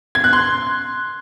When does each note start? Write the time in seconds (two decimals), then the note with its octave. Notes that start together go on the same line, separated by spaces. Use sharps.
0.15 G#6
0.24 F#6
0.33 C6